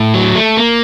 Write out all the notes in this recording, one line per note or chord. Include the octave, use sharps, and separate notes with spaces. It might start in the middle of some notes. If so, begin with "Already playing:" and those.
Already playing: A2
F#3
A3
A#3